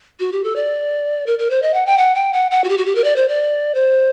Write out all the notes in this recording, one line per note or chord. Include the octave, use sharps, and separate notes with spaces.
F#4
G4
A4
D5
A#4
A#4
C5
D#5
F#5
G5
F#5
G5
F#5
F#5
F#4
G4
F#4
G4
A#4
D5
C5
D5
C5